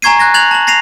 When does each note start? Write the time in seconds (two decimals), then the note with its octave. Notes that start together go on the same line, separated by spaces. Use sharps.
0.02 G#5 A#5 C#6 G#6 C7 D#7
0.19 F#6 G#6 A#6
0.34 F#6 G#6 A6 F7 F#7
0.51 A5 F#7
0.67 A6 A#6 C7 D#7 F7